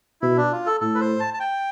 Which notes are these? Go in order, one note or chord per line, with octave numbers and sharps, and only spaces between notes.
B2 E4
D4
F4
A4
A2 A4
B4
C5
A5
A5
G5